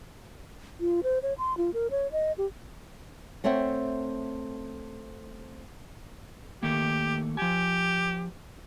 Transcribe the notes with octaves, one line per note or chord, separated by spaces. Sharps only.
F4
C5
C#5
C6
F4
A#4
C#5
D#5
G4
A3 C4 C#5 E5 F#5 G5
D#3 A3 A#3 G4
F3 G4 G#5